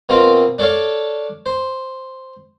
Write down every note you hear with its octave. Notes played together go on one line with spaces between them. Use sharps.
B2 A#3 C4 F4
D4 A4 C#5 D5 F5
C5